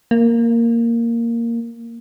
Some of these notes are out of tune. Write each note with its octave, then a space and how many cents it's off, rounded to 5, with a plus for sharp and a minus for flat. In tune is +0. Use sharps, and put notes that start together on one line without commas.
A#3 -5